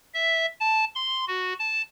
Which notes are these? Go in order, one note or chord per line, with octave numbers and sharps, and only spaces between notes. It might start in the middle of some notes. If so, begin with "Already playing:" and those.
E5
A5
C6
F#4
A5